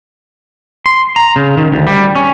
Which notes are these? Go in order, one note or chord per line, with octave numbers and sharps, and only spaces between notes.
C6
A#5
C#3
D#3
D2
G3
C#4